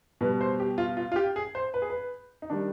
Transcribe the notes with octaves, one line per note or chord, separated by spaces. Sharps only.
B2 G3 B4
C5
G4
F4
F4
F4
G4
G#4
C5
B4
G#4
B4
D#4
D#3 G3 D4